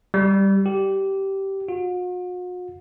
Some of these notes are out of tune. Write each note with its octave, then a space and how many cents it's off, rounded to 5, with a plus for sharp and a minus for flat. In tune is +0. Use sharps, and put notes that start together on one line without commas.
G3 +0
G4 -15
F#4 -45